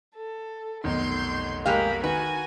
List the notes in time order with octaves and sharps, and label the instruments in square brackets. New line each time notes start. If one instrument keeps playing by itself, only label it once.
[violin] A4
[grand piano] F1 B1 D#3 [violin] C6 G6
[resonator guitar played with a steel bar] G#3 G4 F5 [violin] A#3 B5
[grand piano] D#3 [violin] F#4 G#5 [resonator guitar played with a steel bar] B4